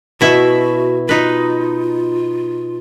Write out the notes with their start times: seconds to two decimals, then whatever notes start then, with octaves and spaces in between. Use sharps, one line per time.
0.21 B2 E4 F#4 E5
1.09 D#4 F4 B4